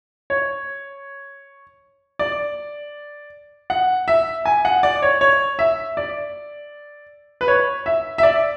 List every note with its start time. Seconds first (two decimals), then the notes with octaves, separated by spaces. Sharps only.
0.30 C#5
2.19 D5
3.70 F#5
4.08 E5
4.45 G#5
4.65 F#5
4.83 D5
5.02 C#5
5.21 C#5
5.59 E5
5.97 D5
7.41 B4
7.48 C#5
7.86 E5
8.18 E5
8.23 D5